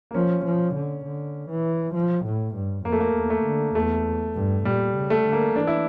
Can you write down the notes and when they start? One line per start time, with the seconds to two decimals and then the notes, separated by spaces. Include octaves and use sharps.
0.11 A#3
0.14 F3 C#4
0.45 F3
0.75 D3
1.05 D3
1.50 E3
1.95 F3
2.25 A2
2.55 G2
2.85 F2 A#3
2.92 A3
3.00 A#3
3.15 E2
3.30 A3
3.45 D3
3.75 E2 A3
4.35 G2
4.65 A#2 G3
4.96 C#3
5.10 A3
5.26 D3
5.33 A#3
5.55 E3 D4
5.67 E4